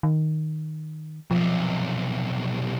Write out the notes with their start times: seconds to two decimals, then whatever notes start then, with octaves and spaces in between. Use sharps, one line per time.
0.03 D#3
1.31 B1 C3 F3